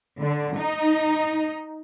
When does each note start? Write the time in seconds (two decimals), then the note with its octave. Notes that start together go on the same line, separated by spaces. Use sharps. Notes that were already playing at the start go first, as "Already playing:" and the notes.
0.21 D3
0.58 D#4